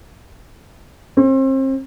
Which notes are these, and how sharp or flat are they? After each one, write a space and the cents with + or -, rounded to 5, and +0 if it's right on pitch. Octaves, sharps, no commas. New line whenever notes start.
C4 +35